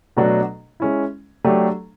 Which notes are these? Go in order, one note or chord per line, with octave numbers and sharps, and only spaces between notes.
B2 F#3 A3 D4 F#4
G#3 C#4 E4
F#3 A3 D4 G4